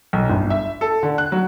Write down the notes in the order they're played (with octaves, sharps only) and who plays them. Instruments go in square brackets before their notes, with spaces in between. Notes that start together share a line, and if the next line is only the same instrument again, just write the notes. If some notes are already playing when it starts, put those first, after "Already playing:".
[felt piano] B1
G1
E5
A4
D3
F#6
F#3